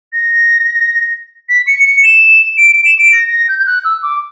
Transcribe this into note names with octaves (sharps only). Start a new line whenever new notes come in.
A#6
B6
C#7
C#7
E7
D7
D7
E7
D7
A#6
A#6
G6
G6
F#6
E6
D6